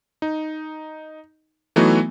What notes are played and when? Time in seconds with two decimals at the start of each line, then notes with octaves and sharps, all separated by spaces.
0.22 D#4
1.76 E3 F#3 A3 B3 D#4 F#4